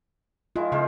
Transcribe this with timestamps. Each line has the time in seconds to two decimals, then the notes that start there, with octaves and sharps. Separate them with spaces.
0.56 D#3 G#3 E4 F4
0.72 C#3 G#3 A#3 C5